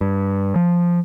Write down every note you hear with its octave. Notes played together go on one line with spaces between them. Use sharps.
G2
F3